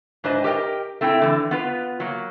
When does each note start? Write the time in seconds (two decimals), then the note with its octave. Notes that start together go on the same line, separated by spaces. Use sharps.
0.24 G#2 D4 B4 C5 D#5
0.44 G4 A#4 D#5 G5
1.01 A3 C4 E4 F#5 G5
1.21 D3 E3
1.51 B3 F4 B4
2.00 F#3 A#3